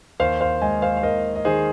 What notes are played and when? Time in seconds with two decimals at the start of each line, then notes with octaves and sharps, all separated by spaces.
0.20 D#2 C5 F5
0.41 C5 F5
0.61 G#3 D#5 G#5
0.82 C5 F5
0.96 F5
1.03 D#2 A#4 D#5
1.36 D#5
1.45 D#3 G#4 C5